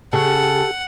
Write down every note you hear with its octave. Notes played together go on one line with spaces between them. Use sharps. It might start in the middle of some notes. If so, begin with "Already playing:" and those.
C#3 G4 A4 F#5